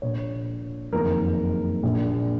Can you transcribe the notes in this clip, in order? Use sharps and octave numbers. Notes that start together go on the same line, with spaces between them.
A#1 A#2 C#5
F#1 F2 D#3 A#4
A#1 A#2